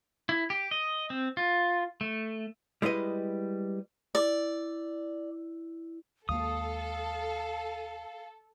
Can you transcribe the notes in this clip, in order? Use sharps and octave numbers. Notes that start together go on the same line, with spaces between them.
E4
G4
D#5
C4
F4
A3
G3 G#3 E4 B4 D#5
E4 D5
D#2 G#3 A#3 A4 F5 D#6